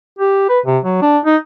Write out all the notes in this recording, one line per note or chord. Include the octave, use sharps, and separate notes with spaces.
G4
B4
C3
F#3
D4
D#4